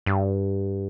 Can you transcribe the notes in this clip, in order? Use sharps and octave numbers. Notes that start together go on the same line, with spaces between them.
G2